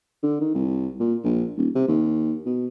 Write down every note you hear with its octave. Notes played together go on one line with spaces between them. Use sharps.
D3
D#3
C2
A#2
A#1
D#1
C3
D#2
B2